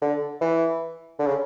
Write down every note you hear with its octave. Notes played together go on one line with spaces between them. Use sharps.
D3
E3
D3
C#3